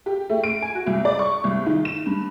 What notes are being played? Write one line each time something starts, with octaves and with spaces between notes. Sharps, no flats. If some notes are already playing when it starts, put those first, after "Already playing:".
G4
A3
D7
G#5
F#4
C2
D5
C#6
C2
D#3
E7
G2